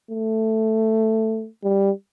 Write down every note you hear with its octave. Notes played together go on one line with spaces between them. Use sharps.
A3
G3